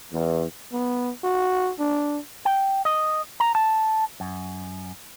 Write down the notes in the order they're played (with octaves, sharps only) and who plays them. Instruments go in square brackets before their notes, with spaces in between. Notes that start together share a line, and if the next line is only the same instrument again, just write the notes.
[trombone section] E2
[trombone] B3
F#4
D4
[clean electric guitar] G5
D#5
A#5
A5
F#2